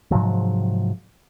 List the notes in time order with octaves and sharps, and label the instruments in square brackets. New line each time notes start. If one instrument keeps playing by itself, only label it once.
[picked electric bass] G#2 C3 F3 F#3